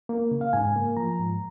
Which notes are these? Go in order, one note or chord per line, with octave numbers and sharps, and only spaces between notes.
A#3
C#3
F5
G#2 G#5
A#3
F3 A#5
G#2